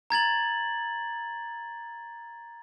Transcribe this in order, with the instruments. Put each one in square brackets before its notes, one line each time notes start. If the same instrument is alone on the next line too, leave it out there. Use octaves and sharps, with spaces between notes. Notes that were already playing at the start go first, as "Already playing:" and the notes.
[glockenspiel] A#5 G#6 A6 F#7